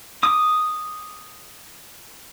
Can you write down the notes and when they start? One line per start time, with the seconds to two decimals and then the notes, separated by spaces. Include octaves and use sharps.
0.23 D6 D#6